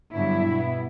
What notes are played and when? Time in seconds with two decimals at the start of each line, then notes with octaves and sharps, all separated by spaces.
0.12 G2 D3 F#3 B3 E4
0.45 B2 G3 B3